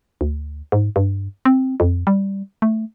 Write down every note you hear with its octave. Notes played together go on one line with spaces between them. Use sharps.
D2
G#2
G2
C4
F2
G3
A3